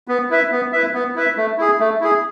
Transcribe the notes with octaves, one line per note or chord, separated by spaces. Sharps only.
B3
E4 B4 E5
B3
E4 B4 E5
B3
E4 B4 E5
A3
E4 G#4
A3
E4 G#4